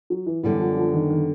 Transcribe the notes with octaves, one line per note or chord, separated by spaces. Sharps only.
F#3
E3
F#2 D3 E3 G3 B3
F3
F3
D#3
D#3